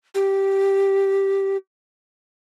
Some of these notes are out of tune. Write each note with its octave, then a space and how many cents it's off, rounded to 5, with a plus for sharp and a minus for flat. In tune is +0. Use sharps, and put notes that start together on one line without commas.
G4 -5